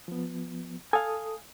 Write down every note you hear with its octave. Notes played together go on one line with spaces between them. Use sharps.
F3 B3
A4 F5 G#5 D#6